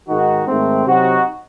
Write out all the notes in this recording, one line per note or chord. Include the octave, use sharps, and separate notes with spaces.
G#2 D#3 G#3 D#4 F#4
G#2 D#3 A3 C4
C3 F#3 C4 D#4 F#4